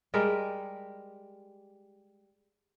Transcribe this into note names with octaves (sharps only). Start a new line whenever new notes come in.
G3 G#3 G4 A#4